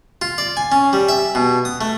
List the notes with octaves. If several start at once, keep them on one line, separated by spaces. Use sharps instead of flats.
F4
D5
G#5
C#4
G3
E5
B2
D#6
A3